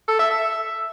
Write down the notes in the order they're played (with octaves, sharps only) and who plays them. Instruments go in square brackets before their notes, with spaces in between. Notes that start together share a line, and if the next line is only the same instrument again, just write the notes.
[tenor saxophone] A4
E5
E5